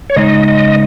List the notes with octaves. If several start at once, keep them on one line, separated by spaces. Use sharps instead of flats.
C#5
C#3 G#3 D#4 D#5
D#5